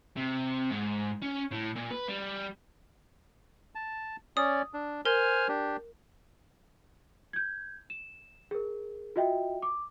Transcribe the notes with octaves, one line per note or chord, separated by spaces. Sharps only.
C3
G#2
C#4
A2
A#2
B4
G3
A5
C#4 D5 D#6
D4
A#4 C5 G#5 F6
D4 G4
G6 G#6
E7
G#4 A#4
F4 F#4 D#5 E5 G5
D6